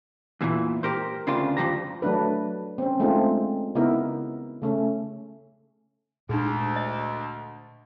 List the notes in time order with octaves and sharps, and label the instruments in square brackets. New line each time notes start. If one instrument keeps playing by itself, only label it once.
[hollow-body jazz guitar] E2 A#2 D3 E3
G4 A#4 C5
D2 C#3 C4 D4 F4 C6
F2 B2 F3 G4 A#5
[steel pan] F#3 A3 D4 B4
C4 C#4
G#3 A3 C4 D4 D#4 F4
C#3 B3 D#4 E4 A#4
C#3 A3 C#4
[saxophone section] D2 [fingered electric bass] A#2 G#3 [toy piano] D4 G#4
[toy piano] D#5